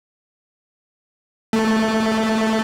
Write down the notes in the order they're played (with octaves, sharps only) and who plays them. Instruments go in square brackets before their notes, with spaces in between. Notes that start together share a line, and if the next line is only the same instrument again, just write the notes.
[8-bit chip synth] A3